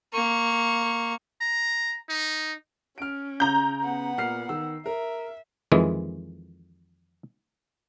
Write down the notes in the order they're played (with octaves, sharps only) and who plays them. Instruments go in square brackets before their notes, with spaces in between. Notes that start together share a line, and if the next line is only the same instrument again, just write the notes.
[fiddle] A#3 C#6
[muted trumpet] A#5
D#4
[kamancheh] C#4 [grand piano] F6 D7
[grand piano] C#3 [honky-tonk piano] A#5 G6
[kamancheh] B3 F#5
[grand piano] A#2 F6 C7
D#3 E6
[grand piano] A#4 [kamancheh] E5
[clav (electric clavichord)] F2 D#3 E3 G#3